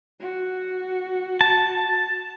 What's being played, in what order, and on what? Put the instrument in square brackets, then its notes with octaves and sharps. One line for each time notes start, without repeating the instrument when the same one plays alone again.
[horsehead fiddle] F#4
[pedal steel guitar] A5